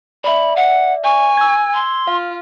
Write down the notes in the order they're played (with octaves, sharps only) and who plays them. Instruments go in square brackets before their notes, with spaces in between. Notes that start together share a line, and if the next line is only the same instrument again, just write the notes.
[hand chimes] D5 E5 [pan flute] B5
[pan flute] F#5
[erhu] G#5 [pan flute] C#6
[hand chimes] E6 G#6
[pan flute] C6
[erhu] F4 [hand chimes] F5